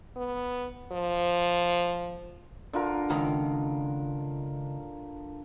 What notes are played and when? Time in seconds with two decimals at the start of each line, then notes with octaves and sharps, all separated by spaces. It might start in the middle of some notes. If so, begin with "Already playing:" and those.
0.16 B3
0.92 F3
2.73 D3 F4 A#4
3.10 C#2 D#3 A#5